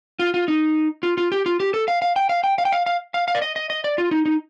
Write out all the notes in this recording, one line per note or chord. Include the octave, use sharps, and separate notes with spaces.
F4
F4
D#4
F4
F4
G4
F4
G4
A4
F5
F5
G5
F5
G5
F5
G5
F5
F5
F5
F5
D5
D#5
D#5
D#5
D5
F4
D#4
D#4